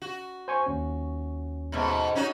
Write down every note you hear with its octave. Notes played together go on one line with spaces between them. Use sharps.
F#4
C5 G#5 C#6
D#2 C#4
G#2 B2 A3
C#4 D#4 F#4